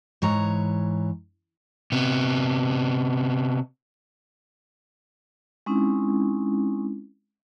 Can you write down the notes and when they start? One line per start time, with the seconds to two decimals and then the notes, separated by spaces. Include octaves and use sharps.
0.22 G#2 E3 C#5 A#5
1.92 C3 B3
5.66 G#3 C4 C#4 D#4 E4